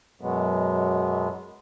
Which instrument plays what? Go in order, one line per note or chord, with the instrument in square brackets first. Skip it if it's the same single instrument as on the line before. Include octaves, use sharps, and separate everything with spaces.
[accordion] F#2 B2 F#3 G#3 B3